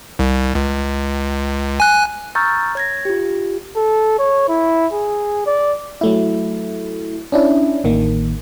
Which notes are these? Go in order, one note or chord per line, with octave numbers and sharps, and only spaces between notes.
C2
C#2
G#5 F#6
A#5 C#6 E6 F6 G6 A6
C#5 G#6 A#6
F4 G4
A4
C#5
E4
G#4
D5
F#3 A3 E4
C#4 D4 E4
A1 D#3 A#3